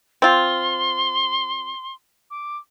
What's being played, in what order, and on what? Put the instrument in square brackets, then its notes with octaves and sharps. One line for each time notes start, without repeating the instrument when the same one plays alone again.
[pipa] C4 F4 [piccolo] C6
[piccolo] D6